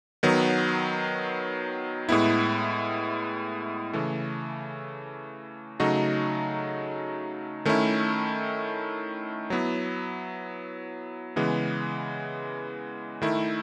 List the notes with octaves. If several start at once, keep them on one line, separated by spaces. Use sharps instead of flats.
D#3 F#3 B3
A2 G#3 B3 E4
C#3 E3 A3
C#3 F#3 A3 D#4 F#4
D#3 A3 C#4 E4
F#3 B3 E4
C#3 E3 G#3 B3
D#3 A3 E4